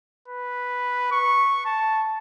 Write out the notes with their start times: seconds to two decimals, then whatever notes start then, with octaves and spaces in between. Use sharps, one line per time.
0.28 B4
1.12 C#6
1.66 A5